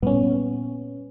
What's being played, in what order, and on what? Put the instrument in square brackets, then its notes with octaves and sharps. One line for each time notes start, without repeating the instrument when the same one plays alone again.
[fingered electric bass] A#2 G3 [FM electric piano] B3 C#4